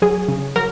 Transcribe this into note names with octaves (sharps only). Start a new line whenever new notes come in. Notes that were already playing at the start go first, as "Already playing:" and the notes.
F#3 G#4
C#3
F#3 A#4